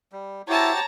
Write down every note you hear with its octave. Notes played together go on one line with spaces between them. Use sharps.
G3
E4 F#4 G4 C5 C#5 A5 A#5 A6